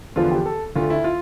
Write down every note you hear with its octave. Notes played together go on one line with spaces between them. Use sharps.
E2 D3 F3 B3 F4
G4
A4
D2 D3 A3 F4
E4
F4